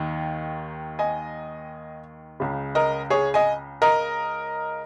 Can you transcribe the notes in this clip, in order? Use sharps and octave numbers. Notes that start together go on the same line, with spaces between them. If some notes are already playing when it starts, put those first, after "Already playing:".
Already playing: D#2 D#3
D#5 G#5
C#2 C#3
A#4 D#5
G#4 C#5
D#5 G#5
A#4 D#5